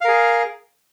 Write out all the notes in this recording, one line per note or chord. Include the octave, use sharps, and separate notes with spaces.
G#4 A#4 F5